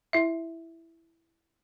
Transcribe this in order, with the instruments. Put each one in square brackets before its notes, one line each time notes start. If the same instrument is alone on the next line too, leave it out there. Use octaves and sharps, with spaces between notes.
[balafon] E4 E5